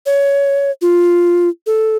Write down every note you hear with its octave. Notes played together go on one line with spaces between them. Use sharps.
C#5
F4
A4